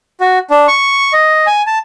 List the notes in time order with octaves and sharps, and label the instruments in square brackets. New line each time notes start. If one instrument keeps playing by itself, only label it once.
[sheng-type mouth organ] F#4
D4
C#6
D#5
G#5
A5